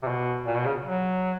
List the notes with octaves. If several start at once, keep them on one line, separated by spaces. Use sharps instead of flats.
C3
B2
A#2
B2
C#3
F#3